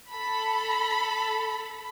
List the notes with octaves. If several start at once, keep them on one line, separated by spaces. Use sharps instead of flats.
A4 B5